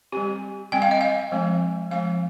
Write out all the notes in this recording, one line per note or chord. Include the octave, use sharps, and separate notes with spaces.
G3 C4 G4
G3 C4 G5
F5
D#5
F5
F3 G#3 C4
F3 G#3 C4 F5